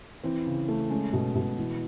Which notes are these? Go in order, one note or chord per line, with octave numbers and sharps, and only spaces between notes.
E3 C4
C#3
A3
G#3 C#4
B2
B2
E3